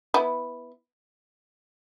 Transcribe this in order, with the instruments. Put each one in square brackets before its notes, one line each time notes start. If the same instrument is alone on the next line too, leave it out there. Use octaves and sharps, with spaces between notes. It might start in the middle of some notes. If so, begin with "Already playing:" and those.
[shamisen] B3 E4